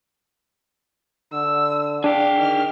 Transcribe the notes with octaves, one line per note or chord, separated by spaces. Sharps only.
D3 E6
D4 G#4 F5 G5
D#3 F6